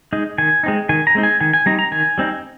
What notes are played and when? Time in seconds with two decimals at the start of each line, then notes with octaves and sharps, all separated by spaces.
0.13 G#3 D#4
0.38 D#3 G#5
0.63 G#3 C4 D#4
0.89 D#3 G#5
1.07 A#5
1.15 G#3 C4 D#4
1.23 G#5
1.41 D#3 G#5
1.53 G#5
1.66 G3 C4 D#4 A#5
1.79 A#5
1.92 D#3 G#5
2.18 G3 C4 D#4